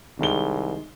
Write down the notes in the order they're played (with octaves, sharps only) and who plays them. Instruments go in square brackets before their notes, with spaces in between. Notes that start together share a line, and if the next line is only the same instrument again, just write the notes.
[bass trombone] C2 [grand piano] D#3 G#3 G7